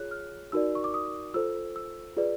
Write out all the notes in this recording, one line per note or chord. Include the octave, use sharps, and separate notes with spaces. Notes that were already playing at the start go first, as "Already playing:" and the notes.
Already playing: F4 G#4 C#5 F#6
F6
D#4 F#4 A#4 D5 E6
C#6
D6
D#6
F4 A4 C5 E6
E6
F4 G#4 B4 D5